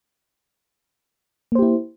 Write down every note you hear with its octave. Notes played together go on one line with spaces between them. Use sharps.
A#3 E4 G4 C5